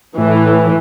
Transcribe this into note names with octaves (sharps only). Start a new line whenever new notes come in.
A2 E3